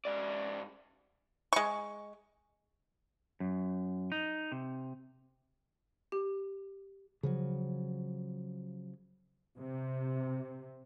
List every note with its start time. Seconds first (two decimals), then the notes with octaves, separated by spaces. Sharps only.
0.05 G#2 D5
1.53 G#3 C#6
3.40 F#2
4.12 D#4
4.52 C3
6.12 G4
7.23 C#3 F3 F#3
9.59 C3